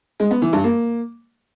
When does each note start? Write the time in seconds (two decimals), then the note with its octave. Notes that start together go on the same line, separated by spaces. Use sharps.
0.20 G#3
0.31 B3
0.42 E3
0.53 G2
0.64 A#3